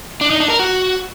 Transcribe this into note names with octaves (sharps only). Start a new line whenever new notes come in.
D4
D#4
D4
A#4
F#4